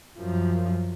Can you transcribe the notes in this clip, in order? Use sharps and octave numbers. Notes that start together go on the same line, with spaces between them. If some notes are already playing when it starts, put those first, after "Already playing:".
F#2 F3